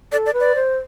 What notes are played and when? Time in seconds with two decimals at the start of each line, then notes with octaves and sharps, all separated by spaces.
0.12 A4 D5
0.26 D5
0.33 B4
0.40 D5
0.55 C5